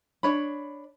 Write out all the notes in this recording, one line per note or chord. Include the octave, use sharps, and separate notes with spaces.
D4 C#5 B5